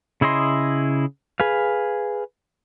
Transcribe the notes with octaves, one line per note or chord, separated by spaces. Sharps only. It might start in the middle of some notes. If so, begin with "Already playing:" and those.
C#3 E4 G#4 D#5 C6
G#4 B4 F5